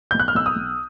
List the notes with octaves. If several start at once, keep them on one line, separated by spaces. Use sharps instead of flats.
B1 G6
F#6
F6
B1 E6
D#6
B1